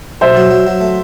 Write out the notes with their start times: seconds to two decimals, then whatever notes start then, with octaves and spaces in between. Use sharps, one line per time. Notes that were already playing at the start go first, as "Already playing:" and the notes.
0.21 B1 C5 E5
0.37 F#3
0.51 F#3
0.67 F#3
0.81 A3